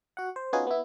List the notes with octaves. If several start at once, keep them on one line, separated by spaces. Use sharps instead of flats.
F#4 F#5
C5
B3 C#4 D#4 F4 F#4 G#4
B3 E4